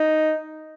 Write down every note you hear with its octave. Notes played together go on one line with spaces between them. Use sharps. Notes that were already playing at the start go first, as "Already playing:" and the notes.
Already playing: D#4